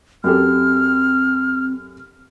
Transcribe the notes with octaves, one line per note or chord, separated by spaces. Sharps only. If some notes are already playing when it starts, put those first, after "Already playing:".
F#2 C4 G4 A4 F6